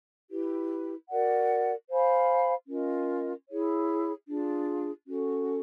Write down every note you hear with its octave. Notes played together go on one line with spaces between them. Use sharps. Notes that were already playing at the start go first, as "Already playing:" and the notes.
E4 G4 B4
F#4 A#4 D5 F#5
C5 F5 G#5 B5
C#4 F4 A#4 D#5
E4 G#4 C#5
D4 F4 G#4
C#4 F#4 A4